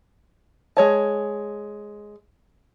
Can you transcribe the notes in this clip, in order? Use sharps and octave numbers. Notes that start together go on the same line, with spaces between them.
G#3 C#5 A5